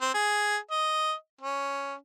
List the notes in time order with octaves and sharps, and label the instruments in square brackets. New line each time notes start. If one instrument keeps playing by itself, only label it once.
[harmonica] C4
G#4
D#5
C#4